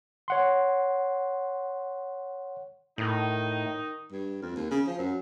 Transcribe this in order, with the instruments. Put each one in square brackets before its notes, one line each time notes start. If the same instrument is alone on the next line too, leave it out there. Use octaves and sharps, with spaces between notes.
[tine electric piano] C#5 F#5 C6
[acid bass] A2 [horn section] D#3 D#4
[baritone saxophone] G2
F2
D#2
C#3
F3
F#2